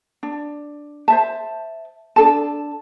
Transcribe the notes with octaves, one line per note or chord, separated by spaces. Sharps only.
D4
C5 E5 A5
D4 A4 A5